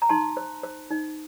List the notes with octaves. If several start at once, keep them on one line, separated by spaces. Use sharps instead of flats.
A#5
D#4 A5 C6
C5
C5
D#4